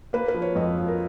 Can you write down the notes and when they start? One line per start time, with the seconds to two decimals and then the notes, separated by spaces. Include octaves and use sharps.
0.13 A#3 B4
0.28 B4
0.34 F3
0.42 C#5
0.55 F2 D#5
0.78 F3
0.88 A#4